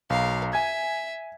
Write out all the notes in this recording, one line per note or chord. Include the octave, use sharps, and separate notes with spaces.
B1 A#4 F5
E5 G#5 G#6